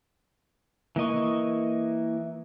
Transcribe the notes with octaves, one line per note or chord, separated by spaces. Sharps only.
E3 A#3 D#5 C#6